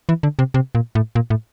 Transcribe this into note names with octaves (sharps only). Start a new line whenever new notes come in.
E3
D3
C3
C3
A#2
A2
A#2
A2